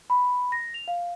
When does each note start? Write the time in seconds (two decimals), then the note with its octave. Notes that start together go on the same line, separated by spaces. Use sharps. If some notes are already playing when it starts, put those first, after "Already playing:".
0.10 B5
0.52 A#6
0.74 F7
0.88 F5